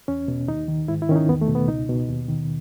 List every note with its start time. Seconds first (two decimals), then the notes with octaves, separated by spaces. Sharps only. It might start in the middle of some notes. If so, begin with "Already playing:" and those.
0.08 E2 C#4
0.28 B2
0.48 D#2 D#4
0.68 D#3
0.88 G#2 E4
1.02 E4
1.09 D#3 C#4
1.16 D#4
1.28 E2 B3
1.41 A3
1.48 B2
1.55 B3
1.68 C#2 D#4
1.89 B2
2.09 D#2
2.28 D#3